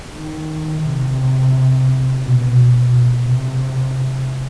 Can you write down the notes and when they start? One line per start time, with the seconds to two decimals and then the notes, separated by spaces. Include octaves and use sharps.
0.14 D#3
0.83 C3
2.22 B2
2.58 B2
2.92 B2
3.27 C3